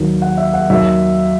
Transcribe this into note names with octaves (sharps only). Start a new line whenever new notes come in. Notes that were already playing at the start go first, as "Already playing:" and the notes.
Already playing: D#2 D#3 F#3
F#5
E5
F#5
D#2 D#3 F#3 E5